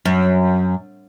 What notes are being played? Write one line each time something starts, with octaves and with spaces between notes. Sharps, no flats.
F#2